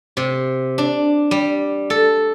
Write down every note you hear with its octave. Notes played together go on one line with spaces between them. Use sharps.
C3
D4
G3
A4